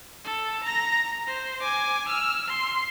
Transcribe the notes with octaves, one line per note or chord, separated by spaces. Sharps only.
A4
A#5 A#6
C5
G#5 D6
E6 F6
C6